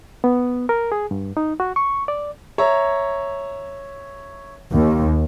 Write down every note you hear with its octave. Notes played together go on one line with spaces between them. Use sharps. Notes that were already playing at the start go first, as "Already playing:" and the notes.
B3
A#4
G#4
G2
D#4
F#4
C#6
D5
C#5 E5 A#5
D#2